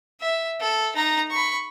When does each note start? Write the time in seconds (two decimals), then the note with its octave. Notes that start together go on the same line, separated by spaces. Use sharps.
0.21 E5
0.60 A4
0.96 D#4 A#5
1.31 B5 C#6